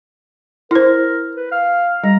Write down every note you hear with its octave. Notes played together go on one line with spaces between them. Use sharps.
E4 A#4 C5
B4
F5
G3 A#5